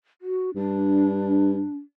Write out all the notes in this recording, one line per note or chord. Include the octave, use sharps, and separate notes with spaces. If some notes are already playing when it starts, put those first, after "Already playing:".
F#4
G2 D4